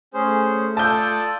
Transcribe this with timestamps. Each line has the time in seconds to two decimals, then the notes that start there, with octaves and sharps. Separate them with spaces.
0.14 A3 C#4 G#4 C5
0.77 F4 A4 D5 A5 D#6 G6